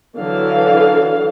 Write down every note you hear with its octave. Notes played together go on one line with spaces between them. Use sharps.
D3 E3 F#3 A4 F5